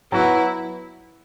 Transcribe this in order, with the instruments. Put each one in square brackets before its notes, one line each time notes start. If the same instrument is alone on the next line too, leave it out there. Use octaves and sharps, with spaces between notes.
[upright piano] F#3 B3 F#4 [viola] E4